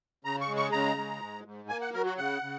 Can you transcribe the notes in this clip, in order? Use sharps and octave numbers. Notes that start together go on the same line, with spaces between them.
C#3 A#5
C#6
G#3
C#6
C#3 A#5
G#3
G#2
G#2
A#3 G#5
F#5
F#3 A#4
F#4
C#3 F#5
C#3